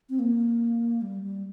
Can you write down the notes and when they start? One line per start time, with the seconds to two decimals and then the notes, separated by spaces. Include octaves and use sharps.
0.10 C4
0.19 A#3
1.02 G3
1.22 G3